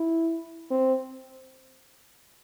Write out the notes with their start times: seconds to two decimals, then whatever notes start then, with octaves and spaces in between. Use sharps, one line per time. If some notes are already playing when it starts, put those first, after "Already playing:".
Already playing: E4
0.71 C4